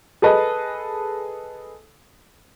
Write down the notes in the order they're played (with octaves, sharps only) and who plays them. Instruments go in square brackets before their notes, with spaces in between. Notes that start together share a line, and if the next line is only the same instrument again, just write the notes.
[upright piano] G#4 A4 B4 D#5